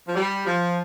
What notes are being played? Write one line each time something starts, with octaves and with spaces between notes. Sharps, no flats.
F3
G3
F3